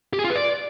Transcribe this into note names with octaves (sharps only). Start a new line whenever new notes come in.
G4
G#4
F4
B4
D5